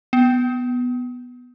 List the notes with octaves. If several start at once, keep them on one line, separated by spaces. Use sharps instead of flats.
B3